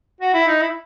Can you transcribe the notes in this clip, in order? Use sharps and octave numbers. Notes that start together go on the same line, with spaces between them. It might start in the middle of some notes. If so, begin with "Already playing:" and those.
F#4
E4
D#4
E4